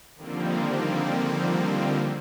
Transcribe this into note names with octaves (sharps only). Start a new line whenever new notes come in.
D3 D#3 F3 G3 A#3 C4